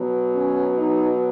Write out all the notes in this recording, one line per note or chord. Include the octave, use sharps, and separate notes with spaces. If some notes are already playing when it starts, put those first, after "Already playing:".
Already playing: B2 F#3
C#4
D#4